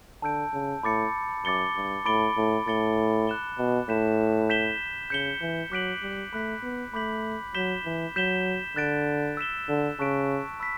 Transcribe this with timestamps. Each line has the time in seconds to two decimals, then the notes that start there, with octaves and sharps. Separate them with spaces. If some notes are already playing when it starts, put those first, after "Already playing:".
0.22 D3 A5 E6 G6 D7
0.53 C#3
0.83 A2 B5 D6 A6 C#7
1.44 F#2 D6 A6 C#7 G7
1.75 G2
2.06 A2 B5 D6 A6 D7 G7
2.36 A2
2.67 A2 D6 A6 C#7 G7
3.27 F#6 A6 E7 G7
3.58 B2
3.88 A2 G6 B6 E7
4.49 G6 B6 E7 G7
5.10 C#3 G6 C#7 G7
5.41 E3
5.71 F#3 D6 F#6 B6 D7 F#7
6.02 G3
6.33 A3 B5 F#6 B6
6.63 B3
6.93 A3 B5 D6 G6 B6 F#7
7.54 F#3 G6 B6 E7 G7
7.85 E3
8.16 F#3 G6 B6 E7 G7
8.76 D3 F#6 A6 D7
9.37 E6 B6 E7 G7
9.69 D3
9.99 C#3 A5 C#6 F#6 B6 D7
10.60 B5 E6 B6